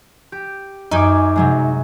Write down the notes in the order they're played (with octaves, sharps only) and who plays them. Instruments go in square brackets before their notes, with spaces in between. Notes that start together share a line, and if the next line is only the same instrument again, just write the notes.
[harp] G4
[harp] F#2 G#5 D6 [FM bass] D#4
[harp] C3 F#3 G#3